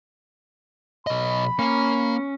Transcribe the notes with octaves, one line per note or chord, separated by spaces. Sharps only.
B1 D#5 B5
A#3 C#4